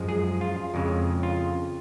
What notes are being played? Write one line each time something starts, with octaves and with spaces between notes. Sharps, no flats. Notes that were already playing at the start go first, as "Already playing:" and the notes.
Already playing: F#2 F3 G#3
G#4
F4
F2 C#3 G#3
F4